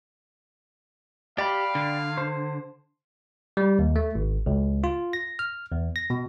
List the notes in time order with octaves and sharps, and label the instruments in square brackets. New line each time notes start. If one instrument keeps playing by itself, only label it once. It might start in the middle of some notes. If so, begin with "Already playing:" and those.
[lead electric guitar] G4 [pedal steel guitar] D5 G5 B5 [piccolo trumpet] F5
[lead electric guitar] D3
[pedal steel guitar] C5
[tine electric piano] G3
D#2
A3
G#1
C#2
F4
A#6
F6
E2
A#6
B2